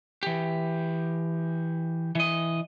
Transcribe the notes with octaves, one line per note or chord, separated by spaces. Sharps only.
E3 G4
E3 D#5